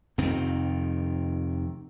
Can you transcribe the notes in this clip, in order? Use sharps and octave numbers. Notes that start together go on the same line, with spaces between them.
F1 F2 D#3 C4